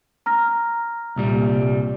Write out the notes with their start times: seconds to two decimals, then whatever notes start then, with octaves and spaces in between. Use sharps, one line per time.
0.26 A#5 F6 A#6
1.16 C2 A#2 G3